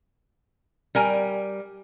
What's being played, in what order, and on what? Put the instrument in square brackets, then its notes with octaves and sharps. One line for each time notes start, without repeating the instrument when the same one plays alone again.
[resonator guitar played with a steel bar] G3 A#4 G#5